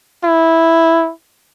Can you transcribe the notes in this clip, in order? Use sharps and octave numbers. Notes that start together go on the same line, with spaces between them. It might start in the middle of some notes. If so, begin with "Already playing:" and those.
E4